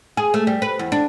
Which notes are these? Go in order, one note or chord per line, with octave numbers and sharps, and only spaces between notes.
G#4
A3
G3
B4
E2
D4